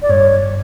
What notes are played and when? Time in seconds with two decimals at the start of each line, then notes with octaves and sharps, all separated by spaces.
0.02 D5
0.09 G2 C#5